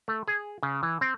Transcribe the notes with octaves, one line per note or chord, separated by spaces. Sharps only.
A3
G#4
C#3
E3
C4